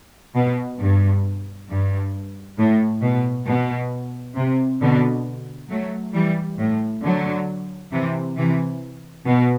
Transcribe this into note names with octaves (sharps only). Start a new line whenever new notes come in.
B2
G2
G2
A2
B2
B2
C3
B2 D3
F#3 A3
E3 G3
A2
D3 F#3
C3 E3
C3 E3
B2